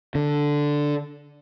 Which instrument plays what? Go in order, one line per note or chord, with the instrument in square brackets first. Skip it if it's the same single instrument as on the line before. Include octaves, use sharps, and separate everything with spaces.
[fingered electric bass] D3